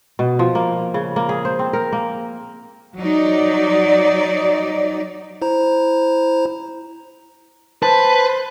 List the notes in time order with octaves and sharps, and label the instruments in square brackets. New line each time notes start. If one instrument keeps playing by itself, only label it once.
[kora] B2
F3
A#3
C#3
A#3
G#4
C5
C4
A#4
A#3
[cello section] F#3 D#4 D5
[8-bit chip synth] E4 C5 A#5
[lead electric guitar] B4 [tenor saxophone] C5 [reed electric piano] A5